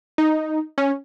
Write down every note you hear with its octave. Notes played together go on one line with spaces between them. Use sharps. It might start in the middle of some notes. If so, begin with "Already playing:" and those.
D#4
C#4